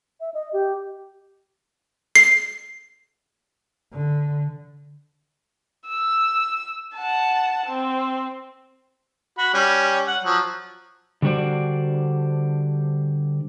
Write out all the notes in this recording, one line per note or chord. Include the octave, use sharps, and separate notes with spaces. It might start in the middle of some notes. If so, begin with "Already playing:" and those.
E5
D#5
G4
C7
D3
E6
F#5 A5
C4
F#4 B5
G3 C#4
F#5
F3 F#3
D3 G3 D4 F#4 C5 D5